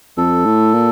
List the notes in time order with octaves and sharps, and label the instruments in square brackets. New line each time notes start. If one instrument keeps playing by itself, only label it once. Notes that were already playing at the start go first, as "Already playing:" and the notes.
[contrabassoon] F2 [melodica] A4
[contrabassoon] A2
A#2